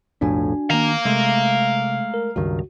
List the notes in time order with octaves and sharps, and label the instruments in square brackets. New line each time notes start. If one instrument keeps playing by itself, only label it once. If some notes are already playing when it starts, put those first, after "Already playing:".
[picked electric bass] B1 F2 A2 [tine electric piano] D4 F#4 G#5
[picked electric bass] D#3 A#3 [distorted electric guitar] F5 A#5
[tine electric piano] C3 [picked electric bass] G#3 A3
[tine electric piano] A#4
[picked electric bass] C#2 G2 D#3 [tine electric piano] F#4